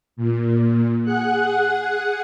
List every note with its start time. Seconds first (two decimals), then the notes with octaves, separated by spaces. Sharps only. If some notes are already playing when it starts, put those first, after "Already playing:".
0.17 A#2
1.04 G#4 F#5 F#6